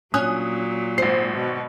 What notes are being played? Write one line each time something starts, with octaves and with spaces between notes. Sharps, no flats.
A#2 F#3 C#4 D#6 F#6
G#1 C5 C7
B2